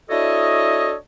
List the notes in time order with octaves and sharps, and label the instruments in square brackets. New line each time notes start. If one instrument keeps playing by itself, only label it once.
[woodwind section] D4 E4 F#4 A4 C#5 D#5